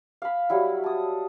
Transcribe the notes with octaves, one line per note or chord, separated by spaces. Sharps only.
F5 B5
F#3 G3 E4
A5 D#6